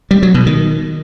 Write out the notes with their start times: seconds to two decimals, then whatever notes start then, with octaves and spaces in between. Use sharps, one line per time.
0.11 G3
0.23 F#3
0.34 B2
0.46 D#3